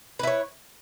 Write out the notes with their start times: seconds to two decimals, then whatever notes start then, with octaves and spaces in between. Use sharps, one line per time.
0.19 B4
0.23 E4
0.27 C#5